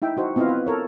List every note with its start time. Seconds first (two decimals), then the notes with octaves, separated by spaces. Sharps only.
0.02 D#4 E4 E5 G5
0.17 D#4 F#4 C5
0.36 B3 C4 E4 F4 D#5 F5
0.49 B4
0.67 A4 A#4 C#5